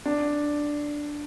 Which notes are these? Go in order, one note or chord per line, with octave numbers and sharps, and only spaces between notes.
D4